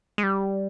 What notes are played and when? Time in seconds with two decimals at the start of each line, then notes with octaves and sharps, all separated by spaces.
0.18 G#3
0.23 G3